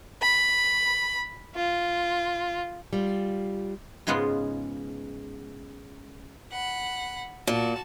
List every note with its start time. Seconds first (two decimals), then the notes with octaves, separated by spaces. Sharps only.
0.22 B5
1.55 F4
2.93 G3 F4
4.07 G#2 C#3 G#3 B3 F4 F#5
6.52 F#5 B5
7.47 A#2 F#4 A5